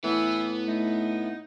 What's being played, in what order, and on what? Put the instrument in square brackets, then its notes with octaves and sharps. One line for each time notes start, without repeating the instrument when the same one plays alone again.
[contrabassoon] A2 [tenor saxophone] E3 [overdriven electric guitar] B3
[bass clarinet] A3 [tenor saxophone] D#4